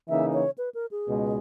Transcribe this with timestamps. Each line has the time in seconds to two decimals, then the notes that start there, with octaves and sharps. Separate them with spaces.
0.09 C#3 E3 A#3 D#4 E5
0.33 C#5
0.58 B4
0.74 A#4
0.91 G#4
1.08 C#2 B2 G#3